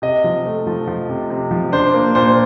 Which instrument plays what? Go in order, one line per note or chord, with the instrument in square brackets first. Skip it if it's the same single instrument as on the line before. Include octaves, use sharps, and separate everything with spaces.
[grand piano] C3 D#5
F3
A3
F3
F3
C3
C3
F3
D4 C5
A#3
A#2 C5